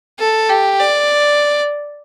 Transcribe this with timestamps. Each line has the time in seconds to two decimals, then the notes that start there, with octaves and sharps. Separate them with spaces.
0.19 A4
0.49 G4
0.79 D5